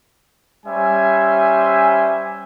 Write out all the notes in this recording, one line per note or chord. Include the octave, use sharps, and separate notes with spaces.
G3 C#4 C5 E5 G#5